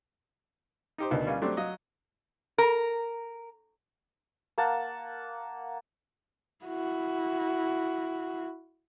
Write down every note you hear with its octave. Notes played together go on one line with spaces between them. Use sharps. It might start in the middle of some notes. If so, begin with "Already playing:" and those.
D#4 G4 C5
D2 B2 D#3
G3 A#3 C#4 F4
F#3 A3 C4 D4 G4
F#3 F4 D#5
A#4
A#3 F#5 A5
E4 F#4